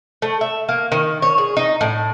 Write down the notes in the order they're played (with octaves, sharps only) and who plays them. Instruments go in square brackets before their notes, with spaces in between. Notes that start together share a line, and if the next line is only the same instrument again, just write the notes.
[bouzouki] A3
E5
A#3
D#3
C#5
G#4
D#4
A2